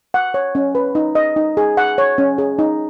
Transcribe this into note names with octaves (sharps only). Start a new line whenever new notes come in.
F#5
C#5
C#4
B4
D#4
D#5
D#4
G#4
F#5
C#5
C#4
G#4
D#4